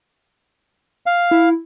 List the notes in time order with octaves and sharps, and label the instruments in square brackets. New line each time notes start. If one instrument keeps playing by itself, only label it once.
[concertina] F5
[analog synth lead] E4